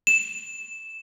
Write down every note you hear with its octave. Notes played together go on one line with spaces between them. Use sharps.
E7